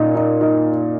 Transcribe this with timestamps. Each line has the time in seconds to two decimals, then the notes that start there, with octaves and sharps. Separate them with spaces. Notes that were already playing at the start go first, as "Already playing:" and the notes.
Already playing: A#2 D#4
0.15 D#4
0.41 D#4